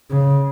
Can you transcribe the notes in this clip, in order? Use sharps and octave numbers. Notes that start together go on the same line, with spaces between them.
C#3